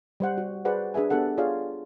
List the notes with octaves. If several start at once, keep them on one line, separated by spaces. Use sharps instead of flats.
G3 C5 F#5
F#4
F#4 G#4 B4 C5 D5 F#5
D4 G#4 B4 E5 G#5
B3 D4 G4 A4 F#5
F4 G#4 C#5 D5 F5